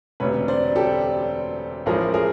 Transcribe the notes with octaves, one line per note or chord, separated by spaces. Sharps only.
E1 D2 C3 B4 C#5
C5 D5
G4 A4
A1 A2 F3 G#3 G#4 A#4
G#4 A#4